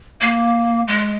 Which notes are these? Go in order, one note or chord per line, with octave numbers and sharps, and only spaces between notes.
A#3
G#3